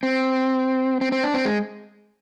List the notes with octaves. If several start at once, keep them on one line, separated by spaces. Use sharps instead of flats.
C4
C4
C4
D4
C4
G#3